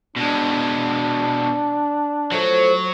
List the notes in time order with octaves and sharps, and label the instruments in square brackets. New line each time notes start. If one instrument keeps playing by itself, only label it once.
[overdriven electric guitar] B2 G#3 [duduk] D4
[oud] F3 A3 [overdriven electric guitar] F#3